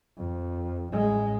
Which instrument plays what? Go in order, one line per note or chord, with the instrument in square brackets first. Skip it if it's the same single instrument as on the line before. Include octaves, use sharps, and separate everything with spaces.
[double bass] F2
A1 G#3